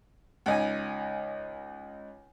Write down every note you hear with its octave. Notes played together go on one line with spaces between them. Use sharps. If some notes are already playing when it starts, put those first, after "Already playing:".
C#2 D#4 G#5